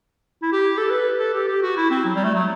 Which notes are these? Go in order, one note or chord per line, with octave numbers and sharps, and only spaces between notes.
E4
G4
A4
B4
A4
G4
G4
F#4
E4
C4
F#3
G3
A3
F#3